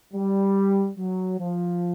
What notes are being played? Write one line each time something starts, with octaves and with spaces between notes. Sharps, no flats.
G3
F#3
F3